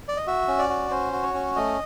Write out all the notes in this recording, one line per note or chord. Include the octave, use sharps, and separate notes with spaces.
D5
D#5
F#4 E5
C#4
D5
F#4
C#4 C5
F#4
C#5
C#4
A3 D#5